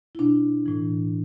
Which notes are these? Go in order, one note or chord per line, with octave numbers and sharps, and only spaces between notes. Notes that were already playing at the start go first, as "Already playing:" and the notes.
E4
B2 D4
A2 E3